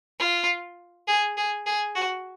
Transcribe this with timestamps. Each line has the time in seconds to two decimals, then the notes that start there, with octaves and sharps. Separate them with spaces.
0.20 F4
1.08 G#4
1.37 G#4
1.66 G#4
1.95 F#4